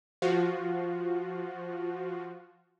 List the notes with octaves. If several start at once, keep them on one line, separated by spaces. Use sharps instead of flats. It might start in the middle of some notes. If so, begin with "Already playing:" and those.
F3 F4 F#4